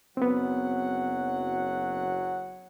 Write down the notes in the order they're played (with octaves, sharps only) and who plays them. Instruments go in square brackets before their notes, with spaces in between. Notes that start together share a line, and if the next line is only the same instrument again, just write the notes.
[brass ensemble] F#1 F#3 F#5 [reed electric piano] B3 C4